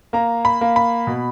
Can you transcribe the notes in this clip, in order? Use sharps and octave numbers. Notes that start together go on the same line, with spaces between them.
A#3 A#5
B5
A#3
B5
B2